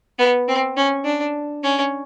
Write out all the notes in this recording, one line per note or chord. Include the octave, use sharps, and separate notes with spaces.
B3
C4
C#4
D4
C#4